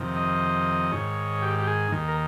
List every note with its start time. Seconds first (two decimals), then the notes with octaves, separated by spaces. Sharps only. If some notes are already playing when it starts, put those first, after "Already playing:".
Already playing: F2 C3 D#3
0.16 D#5
0.92 G#2 D#3 C#5
1.42 G4
1.59 G4
1.67 G#4
1.92 D#2 D#3
2.08 A#4